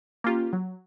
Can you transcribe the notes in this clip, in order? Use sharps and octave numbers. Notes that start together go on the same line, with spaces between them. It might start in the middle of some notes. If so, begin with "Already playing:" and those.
A#3 C#4 F4 G4
F#3